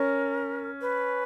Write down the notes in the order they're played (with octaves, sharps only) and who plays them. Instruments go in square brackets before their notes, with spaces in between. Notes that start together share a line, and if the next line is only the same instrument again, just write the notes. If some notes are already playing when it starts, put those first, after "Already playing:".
Already playing: [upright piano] C#4 [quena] A#4
[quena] B4